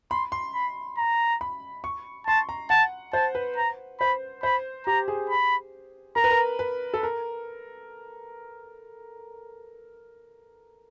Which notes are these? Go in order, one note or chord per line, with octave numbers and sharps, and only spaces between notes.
B5 C6
C6
B5
A#5
B5
C#6
A5 C6
A#5
F#5 A5
C5 A5
B4
A#5
C5 B5
C5 B5
G4 A#5
G#4
B5
A#4 A#5
B4
A#4
B4
A4
A#4